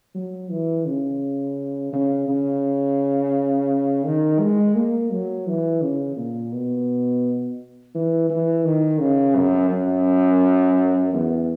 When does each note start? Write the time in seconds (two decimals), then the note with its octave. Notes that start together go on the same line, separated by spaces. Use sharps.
0.15 F#3
0.50 E3
0.86 C#3
1.93 C#3
2.28 C#3
4.05 D#3
4.40 G#3
4.75 A#3
5.11 F#3
5.47 E3
5.81 C#3
6.16 A#2
6.52 B2
7.95 E3
8.29 E3
8.65 D#3
9.00 C#3
9.36 F#2
9.71 F#2
11.13 E2